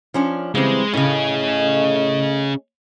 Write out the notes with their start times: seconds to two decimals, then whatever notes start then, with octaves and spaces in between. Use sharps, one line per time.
0.14 F3 C#4 D4
0.55 C#3 E3 G3 G#3 C4
0.94 A2 C#3 A3 C#4 G#4 D#5